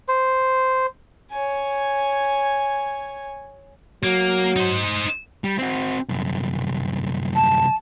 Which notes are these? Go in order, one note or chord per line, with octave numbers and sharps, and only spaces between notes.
C5
C#5 G#5
F#3 A#3
D#4 C5
G3
C4 F#4
C2 F#2
A5